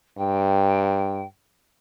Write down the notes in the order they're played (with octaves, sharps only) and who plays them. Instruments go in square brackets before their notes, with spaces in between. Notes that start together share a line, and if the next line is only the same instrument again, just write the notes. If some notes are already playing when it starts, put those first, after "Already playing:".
[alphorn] G2 [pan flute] G5